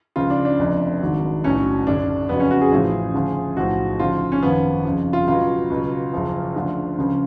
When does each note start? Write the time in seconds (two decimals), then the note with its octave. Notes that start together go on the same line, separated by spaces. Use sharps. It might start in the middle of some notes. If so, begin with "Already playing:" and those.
0.16 C#2 C#3 F3 F4
0.30 D4
0.45 D4
0.59 F1 F2 F3
1.01 G#1 G#2 F#3
1.44 B1 A2 F#3 C#4
1.86 F#1 F#2 D3 D4
2.29 F2 C#3 F#3 B3
2.40 C#4
2.51 F#4
2.61 G#4
2.72 A1 A2 F3
3.14 D2 C#3 F3
3.57 B1 A2 F3 F#4
3.99 D2 C#3 F3 F4
4.32 C#4
4.42 G#1 F#2 F3 B3
4.85 F2 C#3 F3
5.13 F4
5.27 C#2 B2 F#3 F4
5.70 C#2 B2 F#3
6.13 F#1 F#2 F3
6.56 D2 D3 F3
6.98 C#2 C#3 F3